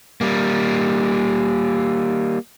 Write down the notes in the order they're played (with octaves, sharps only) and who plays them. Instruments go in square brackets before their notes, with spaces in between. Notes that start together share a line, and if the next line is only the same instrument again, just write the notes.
[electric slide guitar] G3 A#3